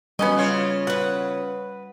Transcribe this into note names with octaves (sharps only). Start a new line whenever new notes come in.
F#3 G3 B3 C#4 D#5
C#3 F4 C#5
B4 F#5